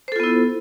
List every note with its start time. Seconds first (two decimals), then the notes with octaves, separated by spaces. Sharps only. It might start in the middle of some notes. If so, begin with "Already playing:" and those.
0.08 C5
0.12 A4
0.16 F4
0.20 B3
0.24 E4